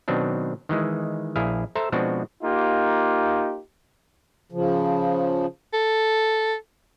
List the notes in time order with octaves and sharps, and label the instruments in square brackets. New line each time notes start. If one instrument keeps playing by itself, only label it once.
[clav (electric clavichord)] B2 D#3 F#3 C4 D4
D#3 E3 G#3
A#1 E4 G#4 F5
A4 C5 E5 A5 A#5
B2 F3 G#3 C4 D4 F#4
[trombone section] A#3 D#4 F4 G4
[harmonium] C#3 F3
[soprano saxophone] A4